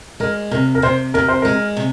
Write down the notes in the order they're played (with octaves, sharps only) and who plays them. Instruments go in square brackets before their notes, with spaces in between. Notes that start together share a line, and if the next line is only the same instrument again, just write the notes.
[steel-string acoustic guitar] G#3 [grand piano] A#4
[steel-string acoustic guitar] C3 [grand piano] A#4
[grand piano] A#4
[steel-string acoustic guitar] C3 [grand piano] C5
[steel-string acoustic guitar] C3 [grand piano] A#4
[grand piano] C5
[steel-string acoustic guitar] G#3 [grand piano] A#4
[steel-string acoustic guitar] C3